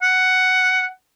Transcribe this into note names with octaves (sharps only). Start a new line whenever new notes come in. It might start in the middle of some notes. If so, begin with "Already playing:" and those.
F#5